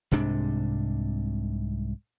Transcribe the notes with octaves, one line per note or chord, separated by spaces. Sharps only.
C2 G#2 C3 D4